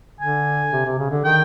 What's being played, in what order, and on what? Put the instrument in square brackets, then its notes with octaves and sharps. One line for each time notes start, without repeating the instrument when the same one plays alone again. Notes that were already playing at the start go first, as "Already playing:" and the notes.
[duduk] D3 [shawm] G#5
[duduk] C3
C3
C#3
D3
[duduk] D#3 [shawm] G5